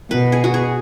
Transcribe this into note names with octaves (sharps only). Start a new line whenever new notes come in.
B2 B4
G#4
F#4
G#4